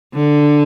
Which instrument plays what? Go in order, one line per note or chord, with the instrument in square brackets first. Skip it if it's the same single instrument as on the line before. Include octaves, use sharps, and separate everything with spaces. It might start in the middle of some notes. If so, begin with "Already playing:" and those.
[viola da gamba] D3